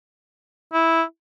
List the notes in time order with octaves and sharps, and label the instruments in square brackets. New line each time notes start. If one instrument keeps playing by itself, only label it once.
[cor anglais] E4